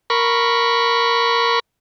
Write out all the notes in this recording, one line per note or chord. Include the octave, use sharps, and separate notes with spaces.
A#4 B5 C#6